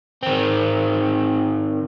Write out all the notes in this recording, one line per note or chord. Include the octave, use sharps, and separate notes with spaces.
D#3 C4